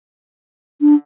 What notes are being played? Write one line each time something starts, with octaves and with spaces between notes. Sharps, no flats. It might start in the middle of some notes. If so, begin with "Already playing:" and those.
D4